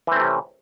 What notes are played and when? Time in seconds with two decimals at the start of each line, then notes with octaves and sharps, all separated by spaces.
0.07 E3
0.12 C4
0.16 A3
0.20 C3
0.24 C#4